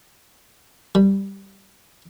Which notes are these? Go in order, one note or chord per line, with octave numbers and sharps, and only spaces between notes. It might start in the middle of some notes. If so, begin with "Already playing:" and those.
G3